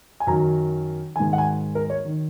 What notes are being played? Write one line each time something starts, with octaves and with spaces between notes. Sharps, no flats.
G#5
F#2 D#3 A#5
G#2 D#3 G#5
F#5
G#5
A#4
C#5
D#3